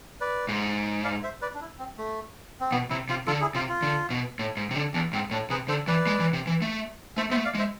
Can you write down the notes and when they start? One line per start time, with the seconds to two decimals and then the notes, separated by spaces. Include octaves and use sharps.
0.21 B4 D5
0.49 G#2
1.04 D5 F5
1.23 C5 E5
1.42 B4 D5
1.55 D4
1.61 E4
1.79 C4
1.98 A3
2.60 C4
2.71 B2 B3
2.90 C3 E4
3.09 C3 F4
3.27 D3 F4 A4
3.41 E4 G#4
3.55 C3 F4
3.69 F4
3.83 D3
4.10 B2
4.39 A2
4.57 G#2
4.71 C3
4.76 D3
4.94 E2 D4
5.13 G#2 C4
5.31 A2 D4
5.50 C3 G#4 B4
5.68 D3 A4 C5
5.88 E3 B4 D5
6.07 G#3
6.20 E3
6.33 C3
6.47 E3
6.62 A3
7.17 A3 C5 E5
7.31 B3 C5 E5
7.37 A3
7.45 D5 F5
7.55 G#3
7.59 C5 E5